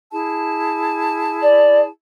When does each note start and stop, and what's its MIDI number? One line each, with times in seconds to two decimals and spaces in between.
0.12 1.89 64
0.12 1.89 68
0.12 1.89 81
1.42 1.80 74